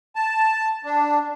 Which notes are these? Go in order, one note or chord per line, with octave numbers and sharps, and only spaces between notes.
A5
D4